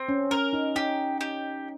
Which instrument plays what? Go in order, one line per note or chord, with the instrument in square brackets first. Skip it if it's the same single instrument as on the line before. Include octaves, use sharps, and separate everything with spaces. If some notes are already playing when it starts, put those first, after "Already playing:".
Already playing: [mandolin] C4
[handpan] C#4
[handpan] C#4 [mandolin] A#4
[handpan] D#4
[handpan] D#4 [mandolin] G4
[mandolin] G4